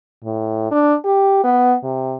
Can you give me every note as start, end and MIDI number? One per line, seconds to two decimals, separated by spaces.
0.25 0.68 45
0.71 0.95 62
1.04 1.40 67
1.44 1.76 59
1.84 2.18 48